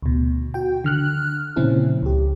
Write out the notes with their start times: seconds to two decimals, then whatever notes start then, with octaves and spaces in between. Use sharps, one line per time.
0.03 D2 B2
0.54 F#4 G5
0.84 D3 F6 F#6
1.56 A#2 C#3 F3 C4 C#4 E4
2.02 C#2 G4